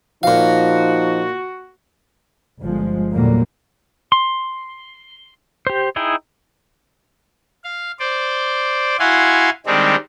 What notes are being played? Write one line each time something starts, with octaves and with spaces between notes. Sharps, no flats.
A#2 F3 D#4 F#4 F5
G1 F3 G#3
E2 A#2 D3 F#3 G3 A#3
C6
G4 C5
D#4 E4 G#4 G5
F5
C5 D5
E4 F#4 F5 F#5 G#5 C6
D#3 G3 G#3 C4 D4 D#4